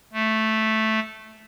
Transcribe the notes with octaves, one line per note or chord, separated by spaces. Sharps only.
A3